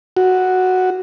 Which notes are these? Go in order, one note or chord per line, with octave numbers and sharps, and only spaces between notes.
F#4